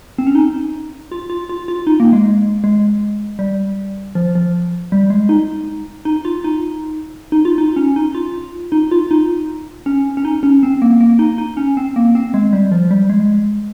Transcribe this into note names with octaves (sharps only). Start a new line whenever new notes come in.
C4
C#4
D#4
F4
F4
F4
F4
D#4
A#3
G#3
G#3
G3
F3
F3
G3
G#3
D#4
D#4
F4
D#4
D#4
F4
D#4
C#4
D#4
F4
D#4
F4
D#4
C#4
C#4
D#4
C#4
C4
A#3
A#3
D#4
D#4
C#4
C4
A#3
C4
G#3
G3
F3
G3
G#3